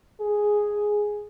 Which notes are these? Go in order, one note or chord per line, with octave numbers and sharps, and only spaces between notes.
G#4